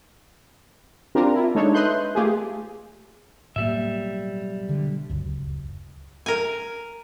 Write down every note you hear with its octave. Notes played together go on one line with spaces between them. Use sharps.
C4 D4 F4 G4 A#4
E4 F4
G#3 D4 D#4 A4 C#5
B4 D#5 E5 C6 F#6 G6
A3 F4 G4 G#4
B1 A2 G3 A#3 E5
D3
D1 C#2 F#2
A#4 G#5